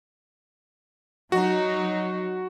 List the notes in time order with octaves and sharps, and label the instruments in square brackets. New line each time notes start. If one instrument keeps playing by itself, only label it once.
[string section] F#3 D#4 [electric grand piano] F#4